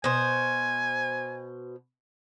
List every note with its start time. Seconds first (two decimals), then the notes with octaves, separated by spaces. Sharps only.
0.04 B2 C5 G#5